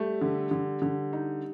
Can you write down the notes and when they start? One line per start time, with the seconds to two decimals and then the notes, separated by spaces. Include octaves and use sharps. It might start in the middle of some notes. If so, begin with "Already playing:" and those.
Already playing: G3 A3
0.21 D3
0.51 D3
0.82 D3
1.13 D#4